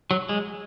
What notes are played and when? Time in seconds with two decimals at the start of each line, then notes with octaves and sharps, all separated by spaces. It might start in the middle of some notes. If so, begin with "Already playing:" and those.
0.11 F#3
0.29 G#3